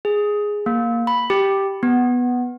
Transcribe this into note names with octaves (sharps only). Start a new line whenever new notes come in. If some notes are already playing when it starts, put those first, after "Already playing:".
G#4
A#3
B5
G4
B3